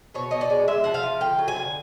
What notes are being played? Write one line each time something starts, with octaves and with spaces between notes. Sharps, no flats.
B2 C#5
B2 D#5
D5
G#3
G#3 E5
F3 F#5
F5
F3
D3 G5
F#3
G#5
D3